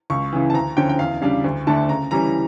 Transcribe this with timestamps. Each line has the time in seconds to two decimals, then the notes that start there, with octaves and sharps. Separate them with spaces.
0.10 C#2 C#6
0.33 C#3 E3
0.50 A5
0.54 D2 A#5
0.77 D3 F3 C#4 G5
0.89 G5
0.99 E2 F5
1.22 C#3 G3 D4 F5
1.44 D2
1.67 D3 A3 D4 A5
1.89 C#3 A#5
2.11 E3 G3 C#4 A#5